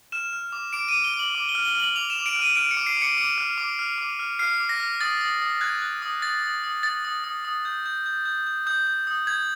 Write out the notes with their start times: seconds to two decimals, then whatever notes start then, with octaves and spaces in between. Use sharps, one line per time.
0.12 F6 E7
0.33 F6
0.52 D6
0.73 D6 D7
0.88 D#7
0.93 D6
1.04 G7
1.14 D6
1.19 F#7
1.35 D6
1.49 G7
1.55 F6
1.65 G7
1.75 F6 F#7
1.95 D6 F7
2.10 E7
2.16 D6
2.26 D7
2.36 F6
2.42 D#7
2.56 F6 D7
2.71 C#7
2.77 D6
2.87 C7
2.97 D6 C#7
3.17 D6 C#7
3.38 F6
3.58 D6
3.79 F6
3.98 D6
4.19 F6
4.39 F6 C7
4.60 D6
4.69 A#6
4.80 F6
5.01 D#6 A6
5.21 D#6
5.42 D#6
5.61 F#6 G#6
5.82 F#6
6.02 D#6
6.22 D#6 A6
6.43 D#6
6.64 D#6
6.83 D#6 A6
7.04 D#6
7.24 D#6
7.45 D#6
7.65 G6
7.86 G6
8.06 G6
8.25 G6
8.47 G6
8.66 D#6 G6
8.87 G6
9.07 D#6
9.27 G6 G#6